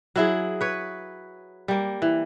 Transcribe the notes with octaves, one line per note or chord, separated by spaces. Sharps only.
F#3 E4 G#4
B4 C#5
G3 A#3
E3